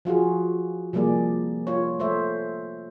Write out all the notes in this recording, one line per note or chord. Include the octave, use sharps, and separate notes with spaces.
F3 F4 F#4 G#4
C3 F3 G3 A#3 G#4 D5
F4 C#5
A3 C5 C#5 E5